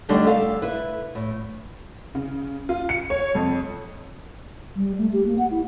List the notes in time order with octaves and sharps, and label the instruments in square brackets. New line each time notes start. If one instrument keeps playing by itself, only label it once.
[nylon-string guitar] D3 G3 A3 D4 D#4
A4 F5
E4 B4
A2
[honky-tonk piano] C#3
F4
C#7
C#5
F2
[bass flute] G3
A3
G4
A#3
F#5
E4